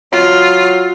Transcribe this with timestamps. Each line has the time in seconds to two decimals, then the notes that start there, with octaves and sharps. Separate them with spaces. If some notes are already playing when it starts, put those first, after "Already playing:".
0.12 F#3 F4